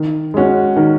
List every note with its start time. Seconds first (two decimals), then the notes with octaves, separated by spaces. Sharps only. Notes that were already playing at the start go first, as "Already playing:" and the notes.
Already playing: D#3
0.34 G#3 C#4 F#4
0.76 D#3